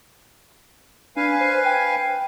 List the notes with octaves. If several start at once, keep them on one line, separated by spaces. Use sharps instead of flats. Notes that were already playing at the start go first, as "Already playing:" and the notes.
D4 B4 F5 G#5
C5
G5